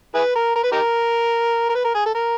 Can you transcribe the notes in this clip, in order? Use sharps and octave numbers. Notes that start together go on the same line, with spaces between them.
E4 G#4 B4
A#4
A#4
B4
D#4 G4 A#4
A#4
B4
A#4
G#4
A4
A#4